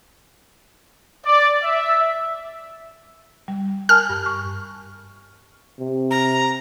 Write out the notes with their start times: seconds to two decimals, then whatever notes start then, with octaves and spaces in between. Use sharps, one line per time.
1.25 D5
1.64 E5
3.48 G3
3.89 A#4 G#5 A5 F6
4.09 G2
4.26 C#6
5.79 C3
6.11 A#5